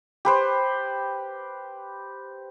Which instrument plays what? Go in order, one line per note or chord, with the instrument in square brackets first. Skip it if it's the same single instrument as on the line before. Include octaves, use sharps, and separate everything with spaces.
[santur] G4 B4 C5